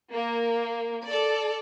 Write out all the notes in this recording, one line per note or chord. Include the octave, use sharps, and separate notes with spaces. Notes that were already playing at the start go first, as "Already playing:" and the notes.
A#3
A4 D5